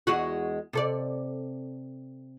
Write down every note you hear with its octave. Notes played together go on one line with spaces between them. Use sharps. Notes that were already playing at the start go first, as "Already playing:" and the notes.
E2 G#3 F#4
C3 A4 D5